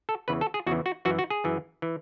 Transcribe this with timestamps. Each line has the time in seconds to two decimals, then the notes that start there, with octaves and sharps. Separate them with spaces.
0.09 A4
0.28 E2 C#3 E3 B4
0.41 A4
0.54 G#4
0.66 E2 C#3 E3 F#4
0.86 F#4
1.05 F#2 E3 F#4
1.19 F#4
1.30 G#4
1.44 F#2 E3
1.82 E3